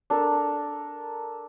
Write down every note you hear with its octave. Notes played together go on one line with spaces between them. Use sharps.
D4 A4 A#4